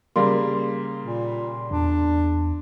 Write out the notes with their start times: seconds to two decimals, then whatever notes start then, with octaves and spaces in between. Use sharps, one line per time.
0.16 C#3 G3 A#3 C6
1.02 A#2
1.71 E2 D4